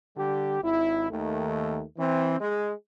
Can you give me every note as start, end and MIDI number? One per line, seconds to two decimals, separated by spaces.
0.17 0.62 50
0.17 0.62 55
0.17 0.62 67
0.62 1.06 32
0.62 1.06 64
1.10 1.83 39
1.10 1.83 51
1.10 1.83 57
1.98 2.39 52
1.98 2.39 60
2.40 2.72 56